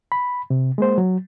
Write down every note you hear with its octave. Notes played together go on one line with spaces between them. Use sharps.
B5
C3
G#3 A#3 C5
F#3